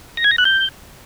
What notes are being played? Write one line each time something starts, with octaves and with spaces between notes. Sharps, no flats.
A#6
G#6
A#6
F#6
G6